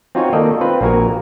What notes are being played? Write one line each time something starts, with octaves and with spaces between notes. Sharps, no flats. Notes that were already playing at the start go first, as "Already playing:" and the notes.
C4 D#4 F4 F#4 C#5 G#5
D#3 A#3 A4 D5 D#5
C4 F4 B4
A#1 A#3 F#4 A#4 G#5